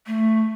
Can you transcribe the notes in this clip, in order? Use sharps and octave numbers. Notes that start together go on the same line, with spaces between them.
A3